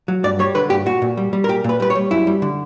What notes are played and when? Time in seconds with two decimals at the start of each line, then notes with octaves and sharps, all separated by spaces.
0.08 F#3
0.24 G2 D5
0.39 G3 C#5
0.55 D3 B4
0.70 G2 G4
0.86 A#2 F#4
1.02 A#2
1.17 G3
1.33 G3
1.44 A#4
1.49 A#2 G4
1.64 A#2 B4
1.80 G3 B4
1.90 C#5
1.95 G3
2.11 F#2 E4
2.27 G3
2.42 D3